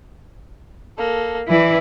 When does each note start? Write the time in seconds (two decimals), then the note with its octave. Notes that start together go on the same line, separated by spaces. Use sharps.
0.98 A#3 A4
1.47 E3 E4 D5